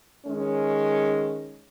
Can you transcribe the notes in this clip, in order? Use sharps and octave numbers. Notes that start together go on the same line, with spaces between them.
D#3 G#3 C#4